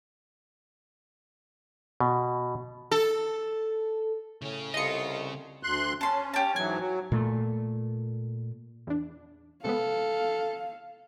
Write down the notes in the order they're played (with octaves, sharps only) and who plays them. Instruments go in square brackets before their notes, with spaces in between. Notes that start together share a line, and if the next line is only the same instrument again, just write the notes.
[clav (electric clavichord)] B2
[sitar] A4
[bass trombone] A2 [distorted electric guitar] C#3 C#4
[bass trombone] C2 [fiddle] F4 A4 [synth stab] D#5 C#7
[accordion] D2 C6 F#6
[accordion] C#4 [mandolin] A5 C6
[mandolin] G4 A5
[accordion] G#2 E3 F#3 [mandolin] G#5
[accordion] F#3
[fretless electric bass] A#2 A3
[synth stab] E2 D4
[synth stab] C3 G#3 B3 [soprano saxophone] A4 [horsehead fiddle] F5